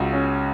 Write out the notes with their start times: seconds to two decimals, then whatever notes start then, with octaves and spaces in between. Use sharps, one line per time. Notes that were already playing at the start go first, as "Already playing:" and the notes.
Already playing: C#2 C#3 F#4
0.13 C#4